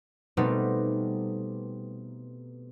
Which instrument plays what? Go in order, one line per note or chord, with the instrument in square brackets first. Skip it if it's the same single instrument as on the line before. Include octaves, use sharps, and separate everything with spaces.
[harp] B2 G3 A3 B3 C4 D#4